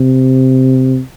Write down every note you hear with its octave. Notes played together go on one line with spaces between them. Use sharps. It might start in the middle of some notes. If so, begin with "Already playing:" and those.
Already playing: C3